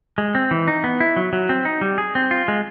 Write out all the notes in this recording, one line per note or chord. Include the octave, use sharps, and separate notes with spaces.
G#3
C4
E3
D#4
B3
E4
F#3
F#3
C4
D#4
G3
G#4
C4
F4
G#3